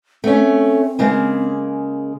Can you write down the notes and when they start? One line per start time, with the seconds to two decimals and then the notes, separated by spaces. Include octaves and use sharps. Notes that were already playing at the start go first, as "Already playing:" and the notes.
0.24 A3 C4 C#4
0.99 C#3 G#3 A#3